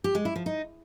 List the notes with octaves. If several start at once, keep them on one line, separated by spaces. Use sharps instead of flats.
G4
G#3
E4
F3
D#4